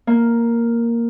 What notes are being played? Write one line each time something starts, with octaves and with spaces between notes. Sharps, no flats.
A#3